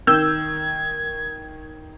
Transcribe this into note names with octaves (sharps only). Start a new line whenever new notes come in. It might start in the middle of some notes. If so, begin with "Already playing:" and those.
D#3 E6 G6 G#6